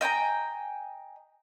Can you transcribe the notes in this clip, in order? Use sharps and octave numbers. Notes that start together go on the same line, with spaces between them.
D#5 G5 G#5 A#5